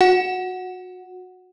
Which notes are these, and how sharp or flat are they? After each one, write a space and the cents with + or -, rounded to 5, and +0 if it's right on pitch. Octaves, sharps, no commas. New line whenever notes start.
F#4 -25 F#5 +0